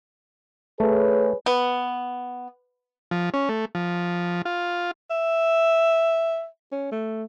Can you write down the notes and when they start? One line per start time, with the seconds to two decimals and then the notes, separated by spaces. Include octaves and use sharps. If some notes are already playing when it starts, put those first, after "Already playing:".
0.80 A3 G#4 B4 C#5
1.46 B3
3.11 F3
3.34 C#4
3.49 A3
3.75 F3
4.45 F4
5.10 E5
6.72 C#4
6.92 A3